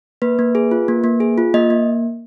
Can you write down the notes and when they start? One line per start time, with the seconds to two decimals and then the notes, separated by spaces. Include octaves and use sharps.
0.22 A#3 B4
0.39 A#3
0.55 G#4
0.71 F4
0.88 A#3
1.04 A#3
1.20 G#4
1.38 F4
1.54 A#3 D#5
1.70 A#3